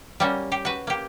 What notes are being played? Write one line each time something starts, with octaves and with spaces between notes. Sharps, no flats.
G3 A#3 C#4 F#4
G4
F#4 B4
A#3 G4